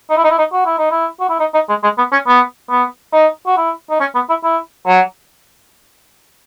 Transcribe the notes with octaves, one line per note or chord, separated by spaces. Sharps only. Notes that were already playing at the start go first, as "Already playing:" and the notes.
D#4
E4
D#4
E4
D#4
F#4
E4
D#4
E4
F#4
E4
D#4
D#4
G#3
G#3
B3
C#4
B3
B3
D#4
F#4
E4
D#4
C#4
B3
E4
E4
F#3